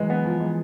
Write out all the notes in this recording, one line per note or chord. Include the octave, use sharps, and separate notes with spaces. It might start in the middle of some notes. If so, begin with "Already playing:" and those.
Already playing: E3 F#3 G#3
B3
F3
G#3